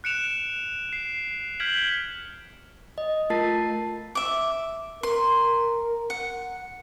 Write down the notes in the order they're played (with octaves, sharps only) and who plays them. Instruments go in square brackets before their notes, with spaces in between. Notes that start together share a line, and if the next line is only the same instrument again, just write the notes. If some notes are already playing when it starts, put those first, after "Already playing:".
[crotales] F#6 C#7 D7 E7 F7
C7
F6 G6 G#6 B6 D7 F#7
[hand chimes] D#5
A3 F4 A#4 A5 A6 C7
[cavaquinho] E5 D6
[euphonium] A#4 [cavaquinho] C6
[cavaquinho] F#5